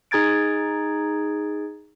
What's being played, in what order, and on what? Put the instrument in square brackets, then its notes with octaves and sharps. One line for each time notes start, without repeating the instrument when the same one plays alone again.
[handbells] D#4 G#4 A#5 G#6 A6 D7